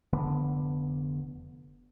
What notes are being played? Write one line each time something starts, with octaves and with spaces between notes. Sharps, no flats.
F1 D3 B3